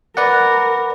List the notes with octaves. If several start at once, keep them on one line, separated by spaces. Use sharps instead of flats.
A#4 B4 D5 F#5